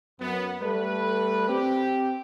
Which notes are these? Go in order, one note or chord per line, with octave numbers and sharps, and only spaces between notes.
F#2 B3
G3 A3 A4 B4
C4 G4